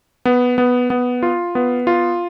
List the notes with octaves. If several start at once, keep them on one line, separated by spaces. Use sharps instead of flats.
B3
B3
B3
F4
B3
F4